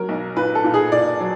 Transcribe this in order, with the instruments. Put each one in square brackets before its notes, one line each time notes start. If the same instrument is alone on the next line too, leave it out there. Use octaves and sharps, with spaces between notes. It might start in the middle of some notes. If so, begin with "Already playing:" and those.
Already playing: [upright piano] F#3 A#4
B1
A#2 B4
A4
A#2
G#4
A#2 D5
F#3